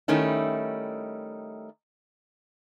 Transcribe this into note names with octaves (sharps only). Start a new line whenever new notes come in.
D#3 G3 A3 C#4 D#4 E4